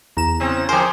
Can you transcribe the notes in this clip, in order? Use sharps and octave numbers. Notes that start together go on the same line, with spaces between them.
E2 A#5 E7
C#3 C4
F3 G4 G#4 A#4 C5